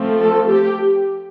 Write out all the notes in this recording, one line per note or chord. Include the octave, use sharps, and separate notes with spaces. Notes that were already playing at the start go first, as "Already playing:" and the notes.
Already playing: F3 A3 C4
A4
G4